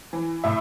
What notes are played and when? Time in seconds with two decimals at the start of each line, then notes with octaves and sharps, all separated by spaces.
0.13 E3
0.44 A2 E5